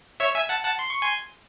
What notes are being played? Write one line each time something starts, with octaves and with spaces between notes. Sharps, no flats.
C#5 E5
E5 G#5
F#5 A5
F#5 A5
C6
C#6
G#5 C6